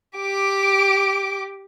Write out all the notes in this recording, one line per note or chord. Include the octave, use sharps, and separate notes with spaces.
G4 D6